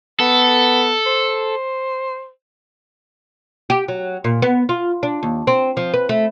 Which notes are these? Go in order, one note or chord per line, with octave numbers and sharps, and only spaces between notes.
B3 A4
C5
G4
F#3
A#2
B3
F4
D4
D#2
C4
F3
B4
A3